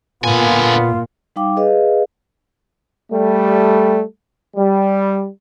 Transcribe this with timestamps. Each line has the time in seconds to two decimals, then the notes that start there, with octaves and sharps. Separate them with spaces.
0.24 A#2 D3 B3 F4 G#5
1.36 G3 D#4 F5 G5 D6
1.57 G#4 B4 D#5 F5
3.12 G3 A3
4.56 G3